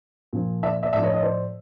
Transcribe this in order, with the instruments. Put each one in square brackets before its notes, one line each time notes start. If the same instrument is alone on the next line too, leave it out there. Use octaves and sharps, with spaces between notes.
[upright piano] A#2 F3
D5 E5
D5 E5
A2 F3 D5 E5
C#5 D#5
C#5 D#5
C5 D5